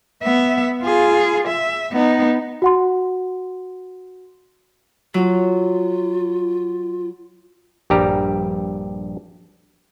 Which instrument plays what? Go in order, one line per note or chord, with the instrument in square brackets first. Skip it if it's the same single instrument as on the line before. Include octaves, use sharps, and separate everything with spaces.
[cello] B3 E5
F4 G#4
E5
B3 D#4
[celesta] F#4 F#5 C6
[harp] F#3 [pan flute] F4
[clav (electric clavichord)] A#1 G2 G3 G4 A#5